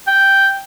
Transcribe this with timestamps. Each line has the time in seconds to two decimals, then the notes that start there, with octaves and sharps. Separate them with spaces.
0.07 G5